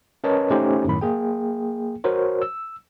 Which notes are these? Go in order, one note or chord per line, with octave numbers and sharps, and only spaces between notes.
C#4 A#4 B4 C#5 D#5 A5
A3 C#4 D#4 G4 C5
F#2 A2 D#3 B5
A#3 G#4 G5
F#4 A#4 C5 C#5
E6